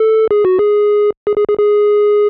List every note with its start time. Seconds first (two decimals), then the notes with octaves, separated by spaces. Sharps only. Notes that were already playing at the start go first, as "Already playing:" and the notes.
Already playing: A4
0.31 G#4
0.45 F#4
0.59 G#4
1.27 G#4
1.37 G#4
1.48 G#4
1.59 G#4